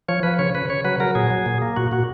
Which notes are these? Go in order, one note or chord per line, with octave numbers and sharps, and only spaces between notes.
F3 C#5
F3 B4
C#3 C#5
C#3 B4
C#3 C#5
F#3 B4
F#3 A#4
A#2 G#4
F#3
A#2
A#3
A#2 F#4
A#2 F#4